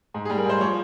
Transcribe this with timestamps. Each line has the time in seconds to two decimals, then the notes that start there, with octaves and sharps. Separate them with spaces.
0.14 G#2
0.25 G#4
0.30 G3
0.37 A#4
0.46 G#2 C5
0.60 F3 C#5